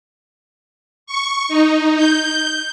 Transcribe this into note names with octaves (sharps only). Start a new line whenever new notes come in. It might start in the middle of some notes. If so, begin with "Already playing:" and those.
C#6
D#4
G6